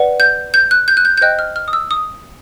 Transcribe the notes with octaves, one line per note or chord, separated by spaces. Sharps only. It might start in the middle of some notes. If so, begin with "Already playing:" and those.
Already playing: B4 D5 F#5
G6
G6
F#6
G6
F#6
G6
G6
C5 D#5 G5 F#6
F6
F6
D#6
E6
D#6